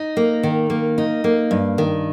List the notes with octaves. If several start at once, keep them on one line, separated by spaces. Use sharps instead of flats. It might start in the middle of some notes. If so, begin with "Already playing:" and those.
Already playing: D#4
A#3
D#3
A#3
D#4
A#3
G2
D#3